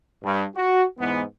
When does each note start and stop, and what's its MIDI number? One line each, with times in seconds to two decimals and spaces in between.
0.24 0.44 43
0.56 0.83 66
0.99 1.22 40
0.99 1.22 44
0.99 1.22 52
0.99 1.22 56
0.99 1.22 59